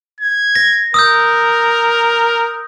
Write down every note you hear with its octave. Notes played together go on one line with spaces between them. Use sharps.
G#6
A#6
A#4 D#6 E6 G6